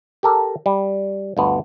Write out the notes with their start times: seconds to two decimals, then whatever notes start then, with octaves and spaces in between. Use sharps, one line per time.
0.23 G4 A4 A#4
0.66 G3
1.37 G1 D2 B3